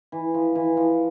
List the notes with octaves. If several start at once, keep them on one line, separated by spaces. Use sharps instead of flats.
E3
F3
E3
F3